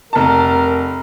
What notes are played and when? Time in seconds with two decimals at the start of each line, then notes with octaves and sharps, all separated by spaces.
0.13 F1 A#4 A5